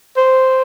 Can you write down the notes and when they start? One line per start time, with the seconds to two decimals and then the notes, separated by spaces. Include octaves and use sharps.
0.17 C5